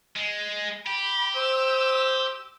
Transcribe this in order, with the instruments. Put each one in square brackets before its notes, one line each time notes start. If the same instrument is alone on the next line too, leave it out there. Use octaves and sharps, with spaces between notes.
[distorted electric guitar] G#3
[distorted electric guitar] G4 [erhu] B5
[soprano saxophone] C5 [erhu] E6